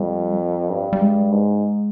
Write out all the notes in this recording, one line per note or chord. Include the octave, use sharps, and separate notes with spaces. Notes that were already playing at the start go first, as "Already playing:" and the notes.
Already playing: F2 G3
G2
G3
G#3
G#2